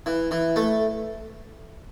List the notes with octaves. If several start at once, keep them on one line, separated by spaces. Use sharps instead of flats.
E3
E3
A3